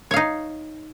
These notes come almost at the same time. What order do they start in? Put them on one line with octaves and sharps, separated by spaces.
C#5 F5 D#4